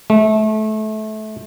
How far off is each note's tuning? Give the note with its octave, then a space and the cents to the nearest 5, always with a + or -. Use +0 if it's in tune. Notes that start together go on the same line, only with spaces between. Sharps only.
A3 -25